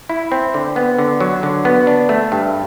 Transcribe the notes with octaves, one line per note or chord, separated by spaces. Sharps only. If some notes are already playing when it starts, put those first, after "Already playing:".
E4
C4
D3
B3
D3
F#3
D3
B3
D4
A3
G2